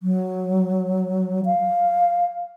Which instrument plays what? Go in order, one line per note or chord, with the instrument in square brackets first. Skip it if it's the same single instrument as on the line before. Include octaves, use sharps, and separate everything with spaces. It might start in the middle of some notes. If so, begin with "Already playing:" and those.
[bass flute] F#3
F5